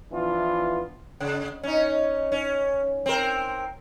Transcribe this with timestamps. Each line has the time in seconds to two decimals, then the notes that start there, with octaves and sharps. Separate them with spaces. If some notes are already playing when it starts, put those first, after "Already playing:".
0.12 E3 F3 B3 D4 E4 F4
1.20 C#3
1.63 C#4 D#4
2.32 C#4
3.06 C4 A#4